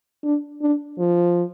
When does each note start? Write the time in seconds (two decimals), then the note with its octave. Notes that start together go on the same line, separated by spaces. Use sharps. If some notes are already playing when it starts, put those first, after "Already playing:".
0.24 D4
0.62 D4
0.99 F3